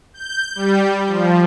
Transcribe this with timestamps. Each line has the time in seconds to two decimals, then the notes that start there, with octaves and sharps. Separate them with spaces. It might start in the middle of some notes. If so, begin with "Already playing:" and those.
0.14 G6
0.55 G3
1.07 F3